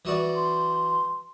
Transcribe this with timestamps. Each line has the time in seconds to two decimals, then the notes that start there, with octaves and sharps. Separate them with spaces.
0.05 E3 F#4 D5
0.35 C6